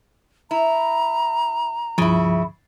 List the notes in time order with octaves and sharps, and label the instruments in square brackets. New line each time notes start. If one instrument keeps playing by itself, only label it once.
[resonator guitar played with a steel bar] E4 [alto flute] A#5
[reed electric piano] C#2 G2 F3 [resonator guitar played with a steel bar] C#3 E4